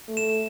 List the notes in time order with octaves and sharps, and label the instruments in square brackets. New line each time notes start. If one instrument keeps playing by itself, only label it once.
[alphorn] A3
[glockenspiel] E7